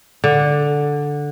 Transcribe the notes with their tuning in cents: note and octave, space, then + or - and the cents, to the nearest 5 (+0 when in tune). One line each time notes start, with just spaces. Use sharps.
D3 -5